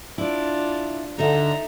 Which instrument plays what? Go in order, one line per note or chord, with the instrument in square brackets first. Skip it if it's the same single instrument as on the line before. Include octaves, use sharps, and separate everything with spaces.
[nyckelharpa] D4 F4 [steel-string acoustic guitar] E4 D5
[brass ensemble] D3 [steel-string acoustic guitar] D#4 A4 E5 [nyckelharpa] A#5